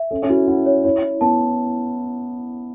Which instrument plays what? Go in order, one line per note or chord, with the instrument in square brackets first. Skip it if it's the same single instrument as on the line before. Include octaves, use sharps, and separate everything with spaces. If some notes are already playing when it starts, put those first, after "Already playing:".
Already playing: [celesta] E5
[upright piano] C#4 [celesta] A4
[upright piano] C#4
[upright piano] E4 [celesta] F#4
[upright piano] E4 [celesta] F#5
[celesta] C#5
[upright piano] E4 [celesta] C#5
[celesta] E4
[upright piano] B3 [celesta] A5